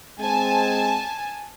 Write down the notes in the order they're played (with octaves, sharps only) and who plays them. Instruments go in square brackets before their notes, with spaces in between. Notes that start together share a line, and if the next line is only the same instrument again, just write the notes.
[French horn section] G#3 C4 [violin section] G#5 A5